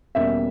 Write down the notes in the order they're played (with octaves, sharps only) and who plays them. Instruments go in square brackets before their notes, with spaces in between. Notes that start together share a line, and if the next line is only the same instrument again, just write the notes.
[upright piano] E2 B2 G3 A#3 C#4 E5